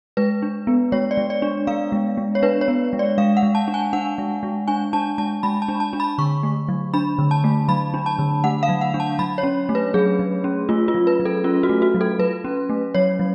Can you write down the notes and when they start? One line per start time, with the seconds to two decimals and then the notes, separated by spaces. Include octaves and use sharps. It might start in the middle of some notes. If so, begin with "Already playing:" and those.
0.17 G#3 B4
0.42 D4
0.67 B3
0.92 G#3 C#5
1.11 D5
1.17 G#3
1.30 D5
1.42 D4
1.67 B3 F5
1.92 G#3
2.18 G#3
2.35 C#5
2.42 D4 B4
2.61 C#5
2.68 B3
2.93 G#3
2.99 D5
3.18 G#3 F5
3.37 F#5
3.43 G#3
3.55 A5
3.68 D4
3.74 G#5
3.93 D4 F#5
4.18 G#3
4.43 G#3
4.68 D4 G#5
4.93 D4 A5
5.18 G#3 A5
5.43 G#3 B5
5.62 A5
5.68 D4
5.80 A5
5.93 D4
6.00 B5
6.18 D3 C#6
6.43 A3
6.68 F#3
6.94 D4 B5
7.18 D3
7.31 A5
7.44 A3
7.68 F#3 B5
7.94 D4
8.06 A5
8.19 D3
8.44 A3 F#5
8.63 F5
8.69 F#3
8.81 F#5
8.94 D4
9.00 A5
9.19 F#3 B5
9.38 C#5
9.43 C#4
9.69 A3
9.75 B4
9.94 F#3 G#4
10.19 F#3
10.44 C#4
10.69 A3 F4
10.88 F4
10.95 F#3
11.07 B4
11.20 F#3
11.25 A4
11.44 C#4 F4
11.63 F#4
11.69 A3
11.82 F#4
11.94 F#3
12.01 A4
12.19 F#3 B4
12.44 C#4
12.69 A3
12.94 F#3 C#5
13.19 F#3